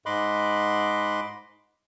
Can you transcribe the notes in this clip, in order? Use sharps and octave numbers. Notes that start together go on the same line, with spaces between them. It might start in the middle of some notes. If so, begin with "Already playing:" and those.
G#2 D#5 B5 C6 D6 F#6